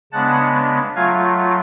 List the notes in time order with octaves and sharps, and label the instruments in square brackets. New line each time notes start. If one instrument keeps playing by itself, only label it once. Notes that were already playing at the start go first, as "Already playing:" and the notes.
[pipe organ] C#3 G#3 B3 D4 F#5 A5
F#3 A3 F4 F5 G#5